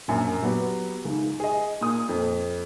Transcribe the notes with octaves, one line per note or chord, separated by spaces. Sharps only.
A#1 F#2 A#2
F#3 B3 G4
C#2 G#2
G#4 D#5
A#2 D#6
F2